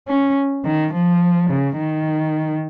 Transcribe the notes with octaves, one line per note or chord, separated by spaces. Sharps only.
C#4
D#3
F3
C#3
D#3